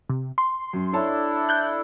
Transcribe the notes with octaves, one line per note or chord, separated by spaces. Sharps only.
C3
C6
F#2
D4 E4 A4 C#5 A5
F#6 G6